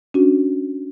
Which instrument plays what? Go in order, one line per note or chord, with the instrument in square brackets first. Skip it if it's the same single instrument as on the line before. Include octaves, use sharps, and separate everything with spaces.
[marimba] C#4 D4 F#4